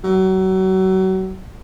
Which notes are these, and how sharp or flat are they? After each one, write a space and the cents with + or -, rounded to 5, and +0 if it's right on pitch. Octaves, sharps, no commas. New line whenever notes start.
F#3 +30